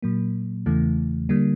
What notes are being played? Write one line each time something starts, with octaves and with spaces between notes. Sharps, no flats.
A#2 F#3 A#3
E2 C#3 E3 A3
D3 G3 A#3